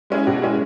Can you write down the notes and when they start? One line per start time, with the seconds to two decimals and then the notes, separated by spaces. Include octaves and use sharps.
0.10 G#3 C#4 E4 G#4
0.27 B2
0.42 G#3 C#4 E4 G#4